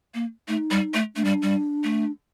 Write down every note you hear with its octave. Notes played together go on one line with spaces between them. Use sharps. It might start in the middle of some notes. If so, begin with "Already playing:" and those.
A#3
A3 D#4
G3
A3
A3 D4
G3
G3
A3